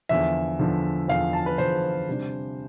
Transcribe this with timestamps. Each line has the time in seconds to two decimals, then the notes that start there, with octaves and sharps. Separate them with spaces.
0.09 E2 D3 F3 E5
0.59 E2 D3 F3
1.08 E2 D3 F3 F5
1.33 A5
1.46 B4
1.58 E2 D3 F3 C5
2.08 C3 G3 D4